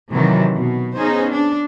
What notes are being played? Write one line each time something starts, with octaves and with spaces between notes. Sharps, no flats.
C3 D#3 E3 F#3
B2
B3 C#4 D#4 G#4 C5
D4